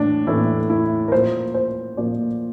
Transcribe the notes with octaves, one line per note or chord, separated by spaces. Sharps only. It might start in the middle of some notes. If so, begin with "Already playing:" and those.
Already playing: A2 E3 D4
A2 E3 A3 E4
E4
A#4
A#2 F3 A#3 C5
C5
A#2 F3 A#3 D5